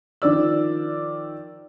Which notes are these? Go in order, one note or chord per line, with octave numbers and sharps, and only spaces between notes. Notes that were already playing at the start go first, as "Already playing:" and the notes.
D#3 F3 D5 E6